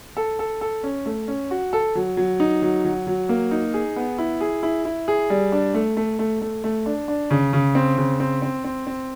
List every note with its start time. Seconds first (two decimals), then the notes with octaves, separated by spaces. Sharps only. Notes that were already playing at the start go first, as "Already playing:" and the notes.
0.17 A4
0.39 A4
0.61 A4
0.84 C#4
1.06 A3
1.28 C#4
1.51 F#4
1.73 A4
1.95 F#3
2.17 F#3
2.40 D#4
2.62 F#3
2.85 F#3
3.07 F#3
3.29 A#3
3.51 D#4
3.74 G#4
3.96 B3
4.18 E4
4.41 G#4
4.63 E4
4.85 E4
5.08 G#4
5.30 G3
5.52 D4
5.74 A3
5.97 A3
6.19 A3
6.42 A3
6.64 A3
6.86 D4
7.08 D4
7.31 C#3
7.53 C#3
7.75 C4
7.97 C#3
8.20 C4
8.42 C4
8.64 C4
8.87 C4